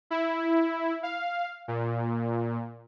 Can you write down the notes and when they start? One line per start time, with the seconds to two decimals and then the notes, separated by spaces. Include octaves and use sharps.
0.11 E4
1.03 F5
1.68 A#2